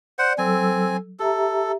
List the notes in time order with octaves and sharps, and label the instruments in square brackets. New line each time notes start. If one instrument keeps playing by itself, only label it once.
[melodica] C5 F#5 [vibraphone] D5
[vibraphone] F#3 A4 E6 [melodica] C4 G#5
[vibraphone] G4 E5 A#5 [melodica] A4